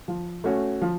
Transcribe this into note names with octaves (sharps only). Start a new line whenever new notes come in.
F3
A3 C#4 F#4
F3